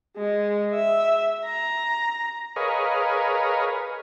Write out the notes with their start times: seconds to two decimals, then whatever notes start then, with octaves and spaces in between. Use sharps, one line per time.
0.17 G#3
0.74 E5
1.45 A#5
2.56 G#4 A#4 B4 C#5 D#5 F5